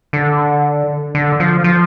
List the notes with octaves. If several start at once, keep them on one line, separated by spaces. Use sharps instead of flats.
D3
D3
F3
F3